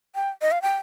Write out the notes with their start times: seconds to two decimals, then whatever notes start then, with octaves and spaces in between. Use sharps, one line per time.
0.15 G5
0.42 D#5
0.52 F5
0.62 G5